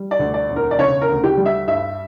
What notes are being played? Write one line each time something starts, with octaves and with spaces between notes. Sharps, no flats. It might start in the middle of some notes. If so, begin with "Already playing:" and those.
Already playing: G3
D5
D2
D5
E1
A#4
D5
C#3 C#5
A#4
D2
G4
G3
E5
G2 E5